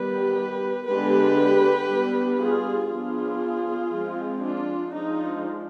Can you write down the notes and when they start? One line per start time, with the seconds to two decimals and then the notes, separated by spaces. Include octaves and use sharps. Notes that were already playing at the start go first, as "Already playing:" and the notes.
Already playing: D#3 G3 B3 G4 B4
0.87 D3 G#3 B3 D4 G4 B4
1.89 G3 B3 D4
2.39 F4 G#4
2.90 F3 B3 D4 F4 G#4
3.92 F3 G#3 C4
4.43 D4 F4
4.94 F3 G#3 D4 D#4